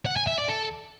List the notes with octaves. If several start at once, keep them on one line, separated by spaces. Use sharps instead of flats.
F#5
G#5
E5
D5
A4